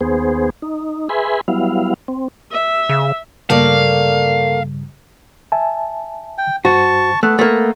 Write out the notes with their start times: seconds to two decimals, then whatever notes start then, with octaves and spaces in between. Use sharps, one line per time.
0.01 D#2 B3 G#4 C5
0.62 D#4
1.09 G#4 B4 E5 G#5 B5 C6
1.48 F#3 G3 B3 E4 F5
2.08 C4
2.52 E5
2.89 C#3
3.50 G2 C#3 G3 A3 A#3 D5 F5
5.52 E5 G#5 A5
6.38 G5
6.65 G2 F#4 C5 A5 C#6
7.23 A3 B3 E6 F#6
7.39 A3 A#3 A6